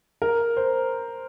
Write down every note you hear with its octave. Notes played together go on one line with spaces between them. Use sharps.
A#4
C5